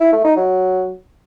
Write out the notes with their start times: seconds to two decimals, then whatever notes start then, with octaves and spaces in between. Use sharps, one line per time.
0.01 E4
0.13 A3
0.25 D#4
0.37 F#3